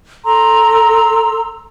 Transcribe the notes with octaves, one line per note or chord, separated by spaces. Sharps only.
A4 A#5 C6 E6